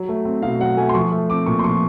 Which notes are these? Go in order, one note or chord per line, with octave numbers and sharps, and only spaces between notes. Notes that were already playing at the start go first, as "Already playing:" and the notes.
Already playing: F#3
A3
C4
B2 F5
F#3 F#5
A3 G#5
C6
F3 C#6
A3
C4 D6
A#2 C#6
C6
F3 C#6